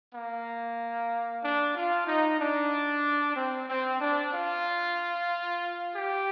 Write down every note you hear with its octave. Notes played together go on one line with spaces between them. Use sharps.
A#3
D4
F4
D#4
D4
C4
C4
D4
F4
G4